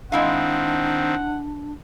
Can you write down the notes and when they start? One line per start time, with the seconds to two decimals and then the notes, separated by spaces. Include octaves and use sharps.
0.12 D#3 G#3 C4 D4 E4 F5 F#5